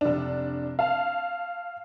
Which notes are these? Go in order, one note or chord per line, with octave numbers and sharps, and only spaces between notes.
F1 D4
F5 A5